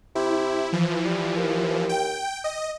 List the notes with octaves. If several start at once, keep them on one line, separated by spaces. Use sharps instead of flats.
C3 E4
E3 F3
G3
D#2
G5
D#5